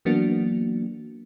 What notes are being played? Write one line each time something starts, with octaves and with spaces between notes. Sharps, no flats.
E3 F#3 A#3 B3 D4 F#4